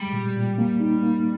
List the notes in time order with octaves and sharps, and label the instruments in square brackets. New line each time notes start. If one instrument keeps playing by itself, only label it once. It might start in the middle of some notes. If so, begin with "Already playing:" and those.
Already playing: [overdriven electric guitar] G3 [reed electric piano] G#3
[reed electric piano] A#2
A#2
A#3
D#4
A#3